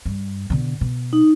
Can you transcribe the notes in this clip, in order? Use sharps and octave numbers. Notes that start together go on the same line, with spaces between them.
G2
B2 D3
B2
D#4